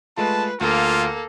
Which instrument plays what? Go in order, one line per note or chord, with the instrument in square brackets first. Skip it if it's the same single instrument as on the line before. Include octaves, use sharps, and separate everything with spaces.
[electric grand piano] G#3 A3 F4 [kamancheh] B4 [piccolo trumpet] A5
[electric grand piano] D2 [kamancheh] A#3 A4 [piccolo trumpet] F4